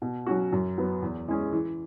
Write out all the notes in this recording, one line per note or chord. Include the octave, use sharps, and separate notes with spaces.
B2
F#3 C#4 F#4
F#2
F#3 B3
E2
E3 G#3 C#4 G#4
E3